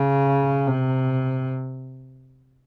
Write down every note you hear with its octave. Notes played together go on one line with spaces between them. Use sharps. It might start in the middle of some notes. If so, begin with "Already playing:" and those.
Already playing: C#3
C3